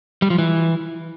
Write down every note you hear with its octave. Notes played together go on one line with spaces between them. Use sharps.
G3
F3
E3